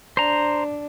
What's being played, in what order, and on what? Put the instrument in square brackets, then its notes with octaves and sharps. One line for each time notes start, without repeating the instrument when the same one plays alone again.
[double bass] D4 [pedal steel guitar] C5 A#5